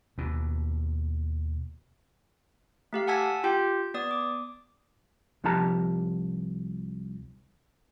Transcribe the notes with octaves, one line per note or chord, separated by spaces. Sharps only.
D#2 B2
A3 G4 F5
F#5 G#5 A5 E6 G#6 B6
F4 G4 G5 G6
B3 D5 D#6
D6
C2 F3 D#4 G4 A5 A#5